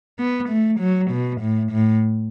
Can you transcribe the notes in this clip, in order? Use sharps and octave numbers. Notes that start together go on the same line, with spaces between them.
B3
A3
F#3
B2
A2
A2